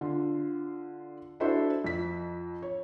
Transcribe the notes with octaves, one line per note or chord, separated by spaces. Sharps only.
D3 F4
D4 E4 F#4 A4 C5 E5
F2 B6
C#5